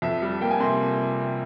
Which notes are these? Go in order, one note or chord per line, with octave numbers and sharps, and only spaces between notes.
F2 E5
G3
A#3 G5
G#5
C3 C6